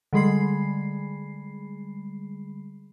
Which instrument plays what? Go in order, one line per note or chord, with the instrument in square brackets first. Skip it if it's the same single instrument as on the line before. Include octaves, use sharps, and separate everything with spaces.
[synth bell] D3 G3 G#3 G#4 B5 C7